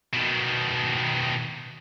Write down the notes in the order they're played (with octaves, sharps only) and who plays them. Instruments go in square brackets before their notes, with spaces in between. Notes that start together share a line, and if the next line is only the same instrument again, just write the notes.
[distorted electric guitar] B2 D#3